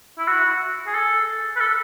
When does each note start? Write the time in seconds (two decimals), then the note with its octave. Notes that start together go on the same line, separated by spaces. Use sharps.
0.18 E4
0.28 F#4
0.87 G#4
0.94 A4
1.56 B4
1.61 A4